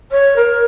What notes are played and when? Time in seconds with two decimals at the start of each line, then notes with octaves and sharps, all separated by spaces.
0.11 C#5
0.36 A#4